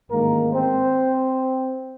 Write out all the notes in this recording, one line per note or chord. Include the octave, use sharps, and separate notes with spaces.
A1 G#2 D#3 G#3 A#3 A#4
C4 C5